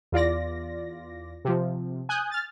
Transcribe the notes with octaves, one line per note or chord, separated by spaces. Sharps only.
E2 F4 D5 A#6
C3 F3
G#5 D#6 F#6 G6
F6 A6